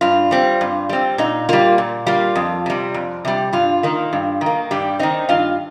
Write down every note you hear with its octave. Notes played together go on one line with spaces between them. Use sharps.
G2 F4
G3 C4
G2
G3 C4
A#2 D#4
G3 A#3 F4
A#2
G3 A#3 F4
F2
C3 G3
F2
C3 G3
G2 F4
D#3 A#3
G2
D#3
A#3
G2 G3 G4
D#3 C4 D#4
G2 F4 F5